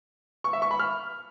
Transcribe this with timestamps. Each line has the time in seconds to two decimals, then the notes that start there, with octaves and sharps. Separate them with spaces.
0.44 C#6
0.53 E5
0.62 C#6
0.71 B5
0.79 F6